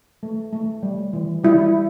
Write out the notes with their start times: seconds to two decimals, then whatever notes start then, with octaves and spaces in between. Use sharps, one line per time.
0.23 A3
0.53 A3
0.83 G3
1.13 E3
1.43 G3 E4